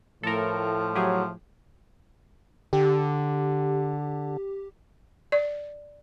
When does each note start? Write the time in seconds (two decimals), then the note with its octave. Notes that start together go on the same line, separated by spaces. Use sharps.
0.23 A2 F3 A4 A#4
0.95 F#3 G4 G#4
2.73 D3 G4
5.32 D5